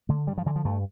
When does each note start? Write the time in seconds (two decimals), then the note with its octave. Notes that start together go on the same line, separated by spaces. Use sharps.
0.09 D3 A3
0.27 G2 G3
0.38 F3
0.46 D3 E3
0.56 F3
0.65 G2 A3